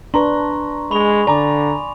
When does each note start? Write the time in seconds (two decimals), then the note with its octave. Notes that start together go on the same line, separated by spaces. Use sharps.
0.14 D4 B4 A#5 C6 C#6
0.91 G#3 B5 C#6 F7
1.27 D3 D5 G#5 A#5 D6